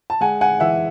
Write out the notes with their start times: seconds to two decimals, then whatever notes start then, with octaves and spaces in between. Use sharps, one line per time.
0.10 A5
0.21 G#3 F#5 G#5
0.41 F#5 G#5
0.60 E3 E5 F#5